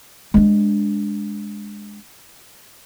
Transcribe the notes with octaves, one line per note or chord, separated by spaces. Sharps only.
G#3 D4